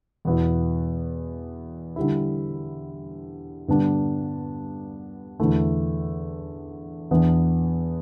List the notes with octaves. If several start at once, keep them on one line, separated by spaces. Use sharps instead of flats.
E2 B2 B3 E4
D3 G3 E4
G2 D3 B3 D4
E2 D3 A3 E4
E2 E3 B3 D4